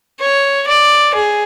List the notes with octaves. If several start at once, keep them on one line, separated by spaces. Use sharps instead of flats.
C#5
D5
G#4